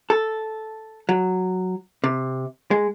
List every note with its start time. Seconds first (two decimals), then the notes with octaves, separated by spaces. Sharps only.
0.10 A4
1.09 F#3
2.04 C3
2.71 G#3